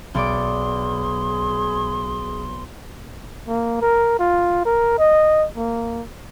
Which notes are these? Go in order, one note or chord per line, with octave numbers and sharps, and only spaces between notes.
B1 G#4 D5 C6 D6
A#3
A#4
F4
A#4
D#5
A#3